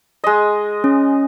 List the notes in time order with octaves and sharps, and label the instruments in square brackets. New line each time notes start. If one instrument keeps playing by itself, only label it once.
[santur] G#3 D#5
[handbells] C#4